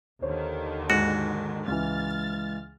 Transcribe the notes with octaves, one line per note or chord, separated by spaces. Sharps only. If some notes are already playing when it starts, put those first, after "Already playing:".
D#2 D3 D#3 C5 C#5
G#2 F#4
C#2 E3 F6 A6